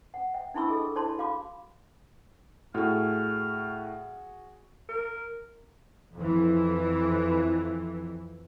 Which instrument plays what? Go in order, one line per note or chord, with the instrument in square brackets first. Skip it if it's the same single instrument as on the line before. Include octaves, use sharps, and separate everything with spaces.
[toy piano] F#5
E5 G5
D4 E4 G#5 B5 C#6 E6
G#4 A4 D#5
E4 C#5 D5 G#5 A5 C6
F#4 F5 B5 D6
[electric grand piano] A2 [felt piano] F#4 G#4 [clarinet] F6
[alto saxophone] A#4
[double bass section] F2 E3